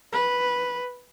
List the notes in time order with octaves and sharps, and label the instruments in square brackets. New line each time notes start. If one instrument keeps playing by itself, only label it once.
[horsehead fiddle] B4